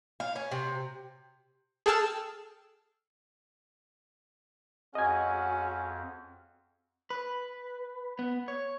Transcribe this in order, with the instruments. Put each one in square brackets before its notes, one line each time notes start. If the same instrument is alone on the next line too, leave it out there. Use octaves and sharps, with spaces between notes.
[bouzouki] F5
C#4
C3
[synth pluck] G#4 A4 G5 A5 E6 F6
[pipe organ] F2 [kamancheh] G#3 F#4 [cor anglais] C#4 [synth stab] D#5 G#5
[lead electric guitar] B4
B3
C#5